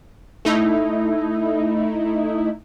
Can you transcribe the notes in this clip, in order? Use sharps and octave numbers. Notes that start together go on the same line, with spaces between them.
A3 D#4 E4